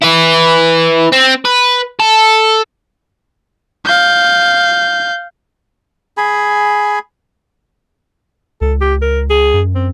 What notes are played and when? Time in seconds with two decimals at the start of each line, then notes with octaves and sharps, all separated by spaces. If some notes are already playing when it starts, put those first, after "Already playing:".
0.02 E4 B4
1.13 C4
1.45 B4
2.00 A4
3.85 F5 G6
6.17 G#4 G#5 B5
8.61 C#2 A4
8.81 G4
9.02 A#4
9.30 G#4
9.53 F#2
9.75 C4